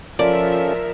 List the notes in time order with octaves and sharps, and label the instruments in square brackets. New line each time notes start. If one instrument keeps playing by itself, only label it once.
[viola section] F3 E5 [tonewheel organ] C#4 F4 A4 [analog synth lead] A#4 [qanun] D5